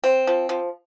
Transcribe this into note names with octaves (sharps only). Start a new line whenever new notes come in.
C4
F3
F3